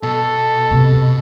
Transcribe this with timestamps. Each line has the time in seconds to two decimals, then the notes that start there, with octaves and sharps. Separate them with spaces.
0.03 B2 A4
0.71 C3 C4